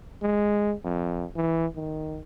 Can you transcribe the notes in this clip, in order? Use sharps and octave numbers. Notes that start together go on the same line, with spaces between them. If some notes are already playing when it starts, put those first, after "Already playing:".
G#3
F2
E3
D#3